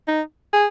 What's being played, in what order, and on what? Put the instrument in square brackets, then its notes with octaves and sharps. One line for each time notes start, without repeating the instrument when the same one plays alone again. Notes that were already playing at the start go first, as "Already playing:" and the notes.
[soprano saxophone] D#4
G#4